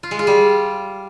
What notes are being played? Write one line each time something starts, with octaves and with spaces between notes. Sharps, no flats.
F4
G#3
F4
G3